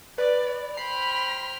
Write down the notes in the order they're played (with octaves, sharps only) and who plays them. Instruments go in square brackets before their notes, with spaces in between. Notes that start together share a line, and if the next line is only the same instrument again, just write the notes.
[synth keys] B4 [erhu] D5
[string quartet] C5 G5 F6 [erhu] B5 [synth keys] C7